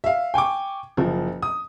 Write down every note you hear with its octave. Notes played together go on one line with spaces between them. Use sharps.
E5 F5
G5 G#5 C#6 D6
F#1 F3
D#6